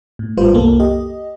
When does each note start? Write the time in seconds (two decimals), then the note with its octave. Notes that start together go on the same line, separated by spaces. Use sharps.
0.19 A2
0.37 G#1 G3 F4 B4 C5
0.53 C2 F#2 A#3 A4
0.80 G4 D#5